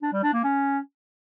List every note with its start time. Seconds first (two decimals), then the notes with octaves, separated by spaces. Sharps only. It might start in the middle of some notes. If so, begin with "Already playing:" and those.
0.02 D4
0.13 G3
0.23 D4
0.33 A#3
0.43 C#4